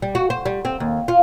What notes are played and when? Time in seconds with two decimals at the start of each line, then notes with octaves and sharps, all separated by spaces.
0.02 G3
0.15 F#4
0.30 C5
0.46 G3
0.65 C4
0.80 D#2
1.08 F4